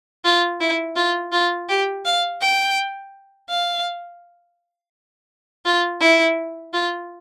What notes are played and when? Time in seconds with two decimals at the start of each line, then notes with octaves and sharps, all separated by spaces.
0.24 F4
0.61 E4
0.96 F4
1.32 F4
1.69 G4
2.05 F5
2.41 G5
3.49 F5
5.65 F4
6.00 E4
6.73 F4